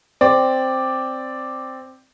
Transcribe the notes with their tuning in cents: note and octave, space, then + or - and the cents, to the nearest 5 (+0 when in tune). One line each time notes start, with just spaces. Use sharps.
C4 +0 D5 +0